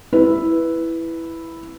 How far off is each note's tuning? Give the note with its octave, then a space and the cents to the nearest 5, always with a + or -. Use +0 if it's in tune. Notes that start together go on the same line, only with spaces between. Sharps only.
E4 +0 B4 +0